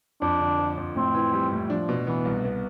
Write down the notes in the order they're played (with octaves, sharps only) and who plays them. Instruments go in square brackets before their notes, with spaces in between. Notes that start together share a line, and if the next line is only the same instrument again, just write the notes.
[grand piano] F2 [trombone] D4
[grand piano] D3
F3
F2
[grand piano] A2 [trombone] C4
[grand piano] E3
G3
A2
[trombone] F3 [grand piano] D4
[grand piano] B2
[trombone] E3 [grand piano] B3
[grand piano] C2
B3